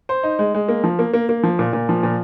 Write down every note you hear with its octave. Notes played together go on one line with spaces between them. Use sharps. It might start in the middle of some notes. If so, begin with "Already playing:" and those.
C5
D#4
G#3
G#3
A#3
F3
A#3
A#3
A#3
F3
A#2
A#2
F3
A#2